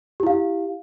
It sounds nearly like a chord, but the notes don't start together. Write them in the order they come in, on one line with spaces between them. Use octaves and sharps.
G4 E4 F5